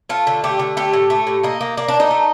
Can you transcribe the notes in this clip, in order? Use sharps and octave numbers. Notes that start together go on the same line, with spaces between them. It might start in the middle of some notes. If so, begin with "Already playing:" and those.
A3 F4
D3
A3 G4
D3
A3 G4
A2
A3
A2
A#3 D#4
A#3
A#3 D4
D4
A#3
D#4
A3